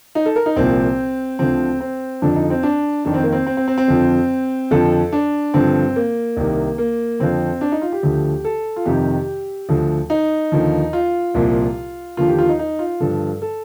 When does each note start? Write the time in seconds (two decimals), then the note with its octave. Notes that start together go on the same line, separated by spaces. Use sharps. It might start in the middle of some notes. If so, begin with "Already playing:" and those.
0.15 D#4
0.26 A4
0.36 A#4
0.46 D#4
0.56 C2 A#2 F3 C4
1.39 D2 D3 F3 C4
1.80 C4
2.22 F2 D3 F3 D4
2.36 D#4
2.50 C4
2.63 D4
3.05 F2 D#3 D4
3.14 C4
3.23 A#3
3.32 C4
3.46 C4
3.57 C4
3.68 C4
3.78 C4
3.88 F2 D3 F3
4.71 F2 D3 F3 A4
5.13 D4
5.54 G2 D3 F3 C4
5.96 A#3
6.37 C2 C3 D#3
6.78 A#3
7.20 F2 D3 F3 C4
7.61 D4
7.72 D#4
7.82 F4
7.92 G4
8.03 D2 D3 F3
8.44 A4
8.76 F4
8.86 F2 C3 D#3 G4
9.69 D2 D3 F3
10.10 D#4
10.52 D#2 D3 F3
10.93 F4
11.34 C2 A#2 F3
12.17 D#2 D3 F3 F4
12.28 G4
12.39 F4
12.49 D#4
12.59 D#4
12.79 F4
13.00 G2 D3 F3 A4
13.42 A4